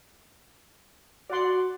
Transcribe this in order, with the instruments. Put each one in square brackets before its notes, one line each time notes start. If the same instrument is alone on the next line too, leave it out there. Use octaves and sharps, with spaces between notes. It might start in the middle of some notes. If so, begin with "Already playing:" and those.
[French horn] F#4 [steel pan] D5 F#5 C6